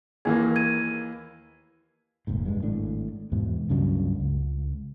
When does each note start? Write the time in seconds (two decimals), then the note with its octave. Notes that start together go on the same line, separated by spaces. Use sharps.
0.25 D#2 E3 A#3 G#4 G#5 G#6
0.43 A#4
0.56 G#6 D#7
2.27 F1 A#1 G#2
2.45 G2 G#3
2.62 G#1 A2 D4
3.32 E2 G#2 B2
3.70 C#2 G2 C#3 F#3
4.20 C#2